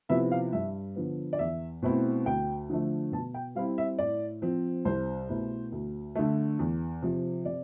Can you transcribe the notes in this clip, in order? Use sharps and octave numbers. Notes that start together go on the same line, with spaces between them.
C3 F3 B3 E4 E5
F5
G2 E5
D3 F3 B3
D5
E2 E5
B2 A3 C4 E4
D2 G5
D3 F3 A3
B2 A5
G5
G3 C4 E4 F5
E5
A2 D5
F3 C4
C2 C5
B2 A3 E4
D2
D3 A3
E2
C3 F3
C3 D5